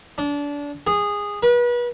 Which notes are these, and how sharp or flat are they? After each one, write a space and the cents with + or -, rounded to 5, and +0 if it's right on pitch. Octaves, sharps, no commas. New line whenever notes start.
D4 -25
G#4 -15
B4 -35